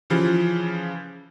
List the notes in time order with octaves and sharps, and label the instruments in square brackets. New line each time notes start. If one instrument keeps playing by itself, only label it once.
[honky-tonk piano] C#3 E3 F3 F4